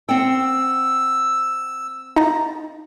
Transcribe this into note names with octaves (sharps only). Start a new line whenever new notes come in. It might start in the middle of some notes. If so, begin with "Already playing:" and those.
C4 F#5 G5 E6
D#4 A5 A#5